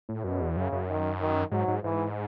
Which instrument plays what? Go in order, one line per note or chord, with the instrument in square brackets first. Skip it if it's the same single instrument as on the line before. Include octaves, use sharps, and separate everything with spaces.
[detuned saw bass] A2
[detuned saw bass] F#2 [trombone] B2
[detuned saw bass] E2
[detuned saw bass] F#2 [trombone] C#3
[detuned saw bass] F#2
[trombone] D#3
D#3
[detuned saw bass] G#2 [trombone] F#3
[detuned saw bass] G#2
[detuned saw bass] G#2 [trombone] E3